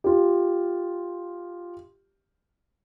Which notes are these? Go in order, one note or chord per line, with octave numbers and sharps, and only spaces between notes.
F4 G4